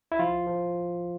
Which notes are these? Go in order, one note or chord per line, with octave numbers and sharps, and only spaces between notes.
E4
F3 F4
F3